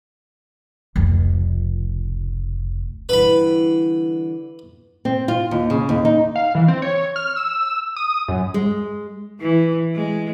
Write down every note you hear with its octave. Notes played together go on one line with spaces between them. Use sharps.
F1 C#2
D3 E3 G3 B4 B5
C4
F4
D#2
C#3
D#2
D#4
F5
E3
C4
C#5
F6
E6
D#6
F#2
G#3
E3
G#3